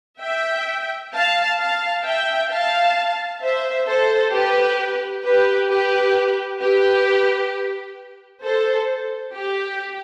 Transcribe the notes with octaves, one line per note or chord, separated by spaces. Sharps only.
E5 G5
F5 A5
F5 A5
E5 G5
F5 A5
C5 E5
A4 C5
G4 B4
G4 B4
G4 B4
G4 B4
A4 C5
G4